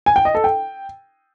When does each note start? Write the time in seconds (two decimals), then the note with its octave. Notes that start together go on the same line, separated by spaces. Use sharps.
0.06 G#5
0.16 G5
0.25 D#5
0.35 A4
0.44 G5